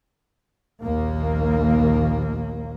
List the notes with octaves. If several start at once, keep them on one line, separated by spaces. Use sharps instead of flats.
A#1 D#2 A#3